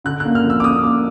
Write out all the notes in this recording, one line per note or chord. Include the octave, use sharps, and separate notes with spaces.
D3 F#6
A#3 F#6
F6
F2
E6
D6
A#3 D#6
A#3 D6